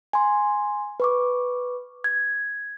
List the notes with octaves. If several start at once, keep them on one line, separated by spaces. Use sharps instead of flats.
G#5 C6
B4 C#6 D6
G#6